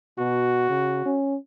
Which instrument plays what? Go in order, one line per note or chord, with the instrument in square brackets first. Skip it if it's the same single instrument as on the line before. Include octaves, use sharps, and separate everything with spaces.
[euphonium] B2 [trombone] F#4
[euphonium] C#3
C#4